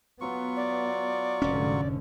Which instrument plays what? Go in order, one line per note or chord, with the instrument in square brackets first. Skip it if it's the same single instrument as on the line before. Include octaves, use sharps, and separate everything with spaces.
[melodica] F#3 F4 C#6 [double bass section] B3
[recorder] D5
[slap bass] F1 C#4 [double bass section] G#2 D3